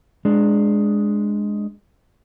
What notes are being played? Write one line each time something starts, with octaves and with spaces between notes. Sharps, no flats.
G#3 D4